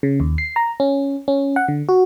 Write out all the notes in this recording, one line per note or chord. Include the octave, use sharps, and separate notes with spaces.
C#3
D#2
C7
A#5
C#4
C#4
F#5
D3
F#4